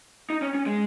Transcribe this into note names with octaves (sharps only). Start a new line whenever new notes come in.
D#4
C#4
C#4
G#3